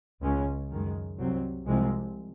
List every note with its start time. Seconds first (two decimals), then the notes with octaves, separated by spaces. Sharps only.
0.22 C#2 C#3 G#3 C#4
0.71 F#2 D#3 G#3
1.18 C2 C3 F#3 C4
1.66 C2 C3 F3 G#3 C4